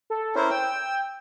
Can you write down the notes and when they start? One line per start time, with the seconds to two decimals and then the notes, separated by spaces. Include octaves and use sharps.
0.10 A4
0.36 C#4 E4 A#4 C5
0.51 G5 E6